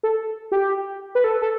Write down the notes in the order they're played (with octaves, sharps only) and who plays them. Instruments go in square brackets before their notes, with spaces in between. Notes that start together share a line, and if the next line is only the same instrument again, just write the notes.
[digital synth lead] A4
G4
B4
A4
A4